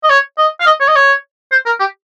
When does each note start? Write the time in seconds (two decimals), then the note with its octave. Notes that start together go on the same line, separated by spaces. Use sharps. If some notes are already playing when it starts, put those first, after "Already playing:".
0.04 D#5
0.10 C#5
0.38 D#5
0.60 F5
0.66 D#5
0.80 C#5
0.88 D#5
0.96 C#5
1.52 C5
1.66 A#4
1.80 G4